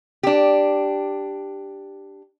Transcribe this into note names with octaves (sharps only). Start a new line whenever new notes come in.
D4 G4